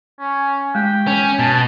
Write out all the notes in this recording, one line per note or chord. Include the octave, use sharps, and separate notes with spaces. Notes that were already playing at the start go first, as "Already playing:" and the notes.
C#4
G#3 G4
C#4
B2 A5